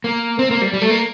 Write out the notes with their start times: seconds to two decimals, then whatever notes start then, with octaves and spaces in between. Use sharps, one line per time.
0.04 A#3
0.39 C4
0.51 A#3
0.62 G3
0.73 G3
0.82 A3
0.90 A#3